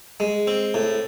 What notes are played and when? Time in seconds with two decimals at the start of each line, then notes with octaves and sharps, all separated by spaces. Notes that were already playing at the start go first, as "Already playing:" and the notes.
0.20 G#3
0.47 C4
0.74 A2